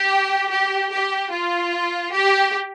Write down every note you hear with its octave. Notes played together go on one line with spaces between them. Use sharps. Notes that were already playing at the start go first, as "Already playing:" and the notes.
Already playing: G4
G4
G4
F4
G4